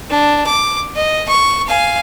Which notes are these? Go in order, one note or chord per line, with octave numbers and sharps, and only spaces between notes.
D4
D6
D#5
C#6
F5 G#5